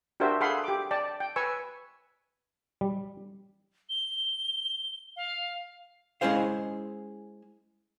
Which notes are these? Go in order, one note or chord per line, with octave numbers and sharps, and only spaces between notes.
D4 F#4 G4 A#4 C5 E5
G#4 A4 F5 F#5 B5 C6
G4 D6
D5 G5 A5
G5
B4 G#5 C#6 E6
G3
G7
F5
G#3 C#4 E4 G#4 C5 F5